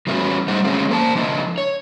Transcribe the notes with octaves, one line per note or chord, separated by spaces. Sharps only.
E3 G3 B3 C#4 E4 F#4
A2 G3 D#4 C5 F#5
D3 F3 G#3 A3 C#4 E4
A#3 C5 D5 A5
F3 D4 E4 D#5
C#5